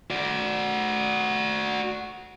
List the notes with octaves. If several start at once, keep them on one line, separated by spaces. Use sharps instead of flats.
F#4 D5